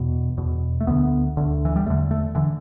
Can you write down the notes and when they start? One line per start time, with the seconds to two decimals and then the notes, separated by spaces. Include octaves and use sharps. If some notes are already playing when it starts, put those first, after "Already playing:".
Already playing: E2 B2
0.37 E2 B2
0.81 A3
0.87 D2 D3 B3
1.37 D2 D3
1.65 E3
1.76 G3
1.86 E2 A3
1.90 D3
2.11 A3
2.35 D3 E3